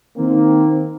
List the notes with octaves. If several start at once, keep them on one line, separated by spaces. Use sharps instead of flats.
D#3 A#3 C4